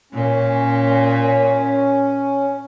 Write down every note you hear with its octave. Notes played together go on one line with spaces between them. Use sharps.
A#2 C#4